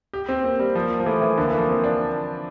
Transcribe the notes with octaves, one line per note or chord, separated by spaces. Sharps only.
G4
C4
A#3 C4
G3
F3
F3
E3 A3
E3
D3 A#3
E3
F3
C4
D4